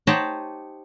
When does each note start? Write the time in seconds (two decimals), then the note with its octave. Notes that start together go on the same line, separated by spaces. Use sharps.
0.07 D#4 G4 C5 C#5 F#5 A5